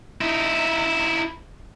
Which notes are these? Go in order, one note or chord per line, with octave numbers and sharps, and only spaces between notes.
D#4 E4